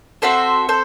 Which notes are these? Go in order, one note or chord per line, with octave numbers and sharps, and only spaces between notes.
C4 F#4 A4 C5 E5
A4 C5